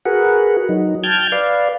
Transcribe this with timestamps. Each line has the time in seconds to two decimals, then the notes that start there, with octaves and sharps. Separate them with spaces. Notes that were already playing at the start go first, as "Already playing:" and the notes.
0.05 F#4 G#4 A#4 B4 F#5
0.69 F#3 D#4
1.04 G5 A5 F6 G6 G#6
1.32 B4 D5 F5